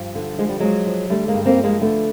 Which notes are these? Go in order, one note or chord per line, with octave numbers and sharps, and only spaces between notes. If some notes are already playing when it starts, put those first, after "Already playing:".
Already playing: G2 F3
D3
F3 G#3
G3
F3 F#3 G#3
F3
D3 G3 A3
G#3 A#3
G2
A#3 C4
F3
G#3 A#3
D3 A3 B3